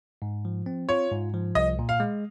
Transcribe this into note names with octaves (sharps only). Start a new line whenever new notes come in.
G#2
F3
C4
F4 C#5
G#2
F3
C2 D#5
A#2
F5
G#3